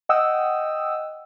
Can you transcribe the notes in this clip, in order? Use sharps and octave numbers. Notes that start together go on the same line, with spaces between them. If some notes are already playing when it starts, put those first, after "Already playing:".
D#5 F#5 G5 D#6 E6